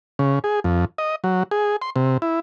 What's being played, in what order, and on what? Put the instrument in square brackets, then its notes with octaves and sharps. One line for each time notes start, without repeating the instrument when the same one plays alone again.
[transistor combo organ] C#3
G#4
F2
D#5
F#3
G#4
C6
C3
E4